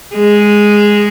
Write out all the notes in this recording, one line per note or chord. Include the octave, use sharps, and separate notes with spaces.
G#3